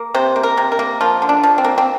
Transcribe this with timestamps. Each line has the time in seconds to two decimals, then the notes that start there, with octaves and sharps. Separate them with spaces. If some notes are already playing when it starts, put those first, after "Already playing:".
Already playing: A#3
0.14 C3 C5
0.36 A#3
0.43 A#4
0.57 C3
0.72 A#4
0.79 A#3
1.01 F3 F4
1.22 D3
1.29 D4
1.43 F3
1.58 C4
1.64 A#3
1.78 C4